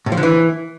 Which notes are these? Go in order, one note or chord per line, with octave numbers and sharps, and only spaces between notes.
A2
F3
D3
E3